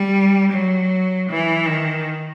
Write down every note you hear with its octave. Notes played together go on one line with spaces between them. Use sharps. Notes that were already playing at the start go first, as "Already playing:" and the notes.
Already playing: G3
F#3
E3
D#3